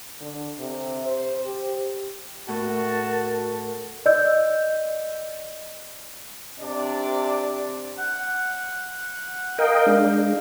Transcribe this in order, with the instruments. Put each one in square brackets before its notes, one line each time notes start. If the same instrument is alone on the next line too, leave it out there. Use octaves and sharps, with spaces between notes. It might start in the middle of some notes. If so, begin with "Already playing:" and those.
[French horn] D3
C3
C5
G4
[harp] A2 [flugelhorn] F#4 [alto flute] A#4 [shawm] A5
[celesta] D5 D#5 E6 G6
[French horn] C3 [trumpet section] D4 D5
[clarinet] F#5
[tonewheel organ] A#4 D#5 G5 [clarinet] F5
[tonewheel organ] G#3 D4